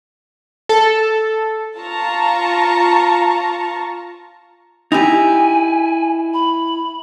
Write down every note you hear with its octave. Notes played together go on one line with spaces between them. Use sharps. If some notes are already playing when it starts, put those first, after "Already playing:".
A4
F4 A5 A#5 C#6
D#4 E4 G4 G#5
B5